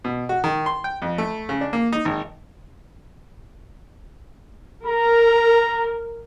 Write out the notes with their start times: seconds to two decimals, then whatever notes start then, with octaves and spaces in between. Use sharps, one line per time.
0.04 B2
0.29 F#4
0.44 D#3
0.66 C6
0.84 G5
1.02 F2
1.18 A3
1.49 C#3
1.61 D4
1.73 A#3
1.93 D#4
2.05 G#1
4.86 A#4 A#5